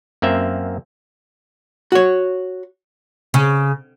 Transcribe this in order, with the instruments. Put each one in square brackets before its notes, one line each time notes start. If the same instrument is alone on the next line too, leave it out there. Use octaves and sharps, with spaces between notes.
[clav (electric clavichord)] F#2 A#3 C4 E5
[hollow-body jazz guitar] F#4 C#5
[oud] C#3